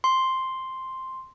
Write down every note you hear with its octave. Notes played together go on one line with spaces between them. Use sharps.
C6